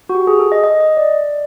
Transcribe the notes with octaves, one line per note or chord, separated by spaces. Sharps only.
F#4
G4
G#4
A4
D#5
D#5
D#5
D5